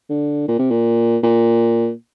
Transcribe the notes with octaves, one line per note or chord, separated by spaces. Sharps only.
D3
A#2
C3
A#2
A#2